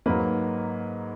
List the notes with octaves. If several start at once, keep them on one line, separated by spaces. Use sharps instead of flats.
G#2 F#3 A#3 B4